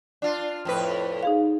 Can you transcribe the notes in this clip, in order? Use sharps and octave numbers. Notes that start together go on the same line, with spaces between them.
D4 F4
F2 A2 B4
D#4 G#4 F5